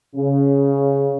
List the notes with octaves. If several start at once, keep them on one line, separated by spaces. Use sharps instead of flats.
C#3